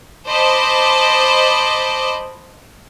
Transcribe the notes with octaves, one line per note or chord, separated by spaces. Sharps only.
C5 D#5 A5 B5 D6